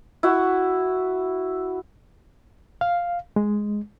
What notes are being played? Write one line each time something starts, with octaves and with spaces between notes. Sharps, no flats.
E4 F#4
F5
G#3